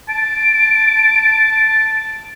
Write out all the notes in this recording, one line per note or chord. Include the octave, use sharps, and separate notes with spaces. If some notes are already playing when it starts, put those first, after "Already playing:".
A5 D7